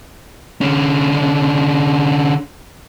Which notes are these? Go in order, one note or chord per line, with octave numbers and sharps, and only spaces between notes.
D3 C#4